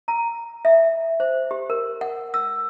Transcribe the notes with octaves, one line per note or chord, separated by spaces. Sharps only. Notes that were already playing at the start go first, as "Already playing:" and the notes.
A#5
E5
C5
G4
A#4
F#5
E6